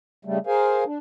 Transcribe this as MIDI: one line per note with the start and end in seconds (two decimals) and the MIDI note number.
0.25 0.38 49
0.25 0.38 55
0.25 0.38 57
0.47 0.84 68
0.47 0.84 70
0.47 0.84 72
0.47 0.84 77
0.47 0.84 80
0.86 0.98 62